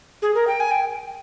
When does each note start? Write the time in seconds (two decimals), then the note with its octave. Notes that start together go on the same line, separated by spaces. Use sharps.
0.22 G#4
0.34 A#4
0.47 G5
0.60 G#5
0.71 G5